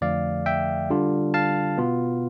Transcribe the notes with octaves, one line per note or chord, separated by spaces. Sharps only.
F2 D3 F3 A3 D5 F5
E5 G5
D3 G3 D4 F4
F5 A5
B2 B3 F4